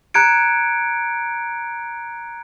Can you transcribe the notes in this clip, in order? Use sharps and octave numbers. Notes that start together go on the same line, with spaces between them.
A#5 F#6 G#6 C#7 D7